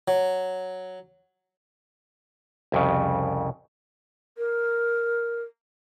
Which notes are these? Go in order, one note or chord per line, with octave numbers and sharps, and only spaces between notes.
F#3
C2 F2 C#3
A#4